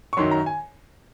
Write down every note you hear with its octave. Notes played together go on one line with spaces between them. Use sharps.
C#6
F#2 D#3 F#3 C6
A#5
G#5